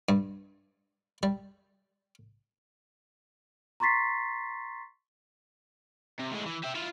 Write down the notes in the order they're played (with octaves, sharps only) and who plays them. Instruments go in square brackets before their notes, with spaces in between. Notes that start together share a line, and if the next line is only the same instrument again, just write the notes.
[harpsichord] G2
G3
[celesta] A#5 C6 C#6 A6 B6 C7
[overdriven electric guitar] C3
A2 G#3
E3
G4 E5
E4 F4